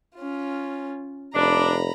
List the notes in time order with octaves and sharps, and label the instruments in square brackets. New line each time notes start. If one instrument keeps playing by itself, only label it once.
[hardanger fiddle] C#4 F4
[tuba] F1 [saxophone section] D4 [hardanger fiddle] A#5 B5